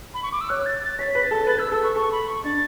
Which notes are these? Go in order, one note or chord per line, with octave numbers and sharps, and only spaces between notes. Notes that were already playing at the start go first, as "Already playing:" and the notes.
B5
C#6
D6
E6
C#5 F#6
A6
A6
C#5 B6
B4
A6
A4
B4 A6
B4 E6
A4 E6
B4 C#6
A4 C#6
B5
C#6
D4 A6